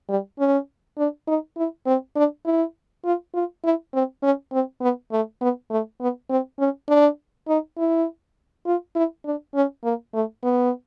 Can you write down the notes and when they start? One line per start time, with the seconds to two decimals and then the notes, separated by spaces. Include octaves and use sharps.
0.09 G3
0.39 C#4
0.98 D4
1.28 D#4
1.57 E4
1.87 C4
2.16 D4
2.45 E4
3.05 F4
3.35 F4
3.64 E4
3.94 C4
4.23 C#4
4.53 C4
4.82 B3
5.12 A3
5.41 B3
5.71 A3
6.01 B3
6.30 C4
6.59 C#4
6.89 D4
7.48 D#4
7.78 E4
8.66 F4
8.96 E4
9.25 D4
9.55 C#4
9.84 A#3
10.14 A3
10.44 B3